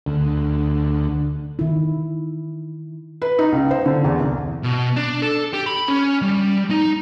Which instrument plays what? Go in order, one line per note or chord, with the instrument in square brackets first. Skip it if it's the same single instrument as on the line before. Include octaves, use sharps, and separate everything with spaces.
[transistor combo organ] D2
[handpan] D#3 E4
[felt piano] B4
D#4
C#2
C5
D3
E2
C2
[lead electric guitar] B2
D4
A4
G4
B5
C#4
G3
D#4